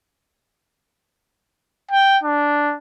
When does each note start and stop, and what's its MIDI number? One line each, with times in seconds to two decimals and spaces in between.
1.91 2.18 79
2.23 2.75 62